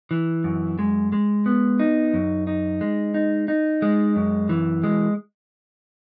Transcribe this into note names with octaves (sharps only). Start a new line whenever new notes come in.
E3
F#2
G#3
G#3
B3
D#4
F#2
D#4
G#3
D#4
D#4
G#3
F#2
E3
G#3